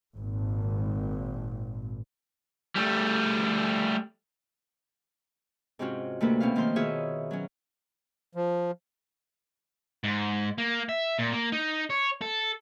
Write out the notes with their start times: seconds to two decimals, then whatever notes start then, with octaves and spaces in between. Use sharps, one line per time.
0.16 G#1 A#2
2.76 G3 A3
5.79 G#2 C3 C4 C#4 F4 F#4
6.21 D2 C3 A3 A#3 B4
6.40 B2 C4 C#4 F5
6.56 D#3 F3 A3 A#3 C5 C6
6.76 B2 D#3 F4 G#4 C#5 E5
7.31 F#3 C#4
8.35 F3
10.04 G#2
10.58 A#3
10.89 E5
11.19 A#2
11.33 A#3
11.52 D#4
11.90 C#5
12.21 A4